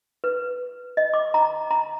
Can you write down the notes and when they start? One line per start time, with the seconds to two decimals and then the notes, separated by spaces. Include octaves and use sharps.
0.24 B4
0.97 D#5
1.14 D6
1.34 A#5
1.71 A#5